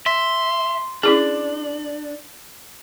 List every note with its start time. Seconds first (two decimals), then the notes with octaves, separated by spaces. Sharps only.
0.06 E5 C6
1.03 C#4 D4 E4 G#4